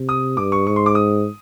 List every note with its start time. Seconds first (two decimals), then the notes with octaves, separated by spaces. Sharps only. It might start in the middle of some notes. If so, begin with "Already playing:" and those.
Already playing: C3
0.09 D#6
0.37 G2 D6
0.52 C#6
0.67 G#2 C#6
0.76 C6
0.86 D6
0.95 D#6